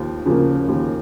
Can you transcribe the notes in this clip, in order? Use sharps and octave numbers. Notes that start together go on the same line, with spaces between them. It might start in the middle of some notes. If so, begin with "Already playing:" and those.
Already playing: D#2 F3
C#3 F3 A#3
D#2